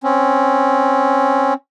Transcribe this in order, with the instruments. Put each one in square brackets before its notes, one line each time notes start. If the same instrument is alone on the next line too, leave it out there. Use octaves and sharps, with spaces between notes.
[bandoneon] C4 C#4